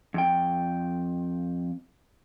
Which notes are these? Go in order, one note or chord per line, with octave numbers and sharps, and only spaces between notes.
F2 G5